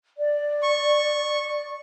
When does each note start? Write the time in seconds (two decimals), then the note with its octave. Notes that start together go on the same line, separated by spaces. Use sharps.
0.17 D5
0.63 C#6